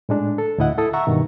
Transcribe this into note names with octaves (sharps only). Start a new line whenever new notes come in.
A2 G#3 D4
A4
D2 A2 E4 D#5 F#5
E4 A4 D#6
E5 F#5 A#5 C#6 E6
G2 B2 D#3